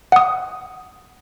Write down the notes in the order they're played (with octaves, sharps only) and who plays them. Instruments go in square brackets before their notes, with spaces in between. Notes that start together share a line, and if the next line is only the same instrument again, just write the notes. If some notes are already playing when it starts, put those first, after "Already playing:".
[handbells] F#5 D#6